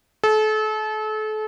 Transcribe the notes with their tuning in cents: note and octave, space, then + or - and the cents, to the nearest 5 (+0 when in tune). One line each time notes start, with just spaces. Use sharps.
A4 -35